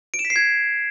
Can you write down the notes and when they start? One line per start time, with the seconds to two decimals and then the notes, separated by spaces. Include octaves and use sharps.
0.14 D7
0.19 E7
0.25 B6
0.30 C7
0.36 G#6